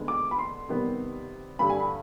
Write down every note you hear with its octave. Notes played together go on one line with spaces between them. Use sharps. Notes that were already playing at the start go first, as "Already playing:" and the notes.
Already playing: D3 G#3 B3
D6
B5
C6
C3 D#3 G3 B3
G2 D3 G3 B5
G#5
B5